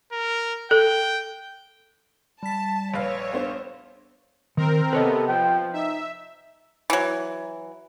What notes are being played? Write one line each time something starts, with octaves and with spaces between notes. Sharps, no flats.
A#4
A4 G5
G3 A5 B6
A#1 B4 C#5 F5
B3 D4 C5
D#3 C4 A#4
C3 B3 A4 B4 C#5 D#5
F3 G5
D#4 E5
E3 F#3